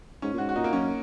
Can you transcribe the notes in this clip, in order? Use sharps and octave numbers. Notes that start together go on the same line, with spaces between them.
G#2 C#4
A#2
G#2 F#4
F#4
A#2 D#4
A#3
F#2 C#4